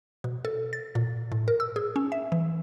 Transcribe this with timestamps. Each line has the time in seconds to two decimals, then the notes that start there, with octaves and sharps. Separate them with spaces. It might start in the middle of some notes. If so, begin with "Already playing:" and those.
0.24 B2
0.45 A4
0.73 A6
0.95 A#2
1.32 A2
1.48 A#4
1.60 E6
1.76 G#4
1.96 C#4
2.12 E5
2.32 E3